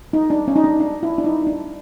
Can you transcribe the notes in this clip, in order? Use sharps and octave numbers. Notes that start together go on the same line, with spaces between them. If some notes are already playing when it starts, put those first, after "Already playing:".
D#4
D4
C#4
D#4
D4
D4
E4
D4
D#4
D4